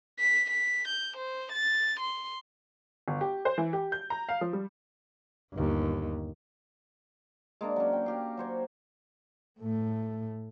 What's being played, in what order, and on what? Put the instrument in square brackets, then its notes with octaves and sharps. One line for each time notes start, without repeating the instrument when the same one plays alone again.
[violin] B6
B6
G6
C5
A6
C6
[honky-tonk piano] G1
G4
C5
E3
G4
G6
A#5
F5
F3
G3
[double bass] G1 D#2
[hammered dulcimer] G#3 A#3 D4
F#3 C#4
G5
F#4 G4 F5
F#3 C5 C#5
[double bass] A2 A3